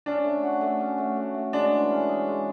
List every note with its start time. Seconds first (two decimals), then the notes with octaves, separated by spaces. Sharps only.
0.06 C#4 D4
0.24 A3
0.43 F#4
0.61 A3
0.80 C#4
0.98 A3
1.16 F#4
1.34 A3
1.53 G#3 D4
1.71 E3
1.90 C#4
2.09 G#4
2.27 G#3